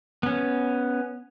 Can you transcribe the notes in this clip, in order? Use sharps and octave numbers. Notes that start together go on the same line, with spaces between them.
B3 C#4